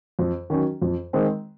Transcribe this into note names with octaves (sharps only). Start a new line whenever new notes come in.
F2
D#3 F#3 C#4
F2
D#3 G#3 C4